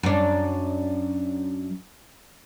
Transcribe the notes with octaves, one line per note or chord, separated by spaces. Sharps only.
F#2 D4